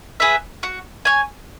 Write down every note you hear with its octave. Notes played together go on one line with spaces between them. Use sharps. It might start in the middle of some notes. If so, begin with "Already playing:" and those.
G#4 B4 E5
F#4
C#5 G#5